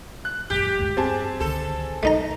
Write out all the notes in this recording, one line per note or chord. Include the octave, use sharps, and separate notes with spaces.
F#6
G#1 F#2 A#2 G4 G6
D2 G2 G#3
G2 C4 G#4 A5
C#2 D3 D#3 A4
B1 A3 D#4 A#5